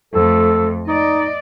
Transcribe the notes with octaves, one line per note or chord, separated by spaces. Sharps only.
F2 A3 A4
D#4 D5 D#5